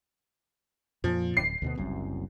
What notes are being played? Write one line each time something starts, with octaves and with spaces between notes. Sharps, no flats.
F2 A#2 F3
D1 C7
D2 B2 B3
F#1 C2 F#2